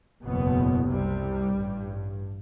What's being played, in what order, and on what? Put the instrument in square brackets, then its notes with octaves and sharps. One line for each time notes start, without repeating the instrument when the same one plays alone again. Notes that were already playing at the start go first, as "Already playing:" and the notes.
[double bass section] F#1 E2 B2 B3
C2 C3 G3
A1 G2